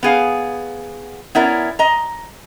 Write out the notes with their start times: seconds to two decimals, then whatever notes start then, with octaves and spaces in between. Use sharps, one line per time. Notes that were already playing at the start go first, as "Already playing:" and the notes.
0.03 B3 G#4 F5
1.35 B3 C#4 E4 A#4 D5
1.79 D#5 A#5